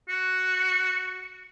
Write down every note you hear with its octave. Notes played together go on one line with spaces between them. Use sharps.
F#4